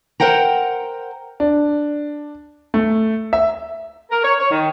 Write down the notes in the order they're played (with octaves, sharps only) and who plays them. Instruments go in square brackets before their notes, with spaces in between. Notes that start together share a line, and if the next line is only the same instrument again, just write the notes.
[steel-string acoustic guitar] A#4 C5 F#5 G5 A#5
[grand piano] D4
A3
E5
[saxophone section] A#4
C#5
C#5
D#3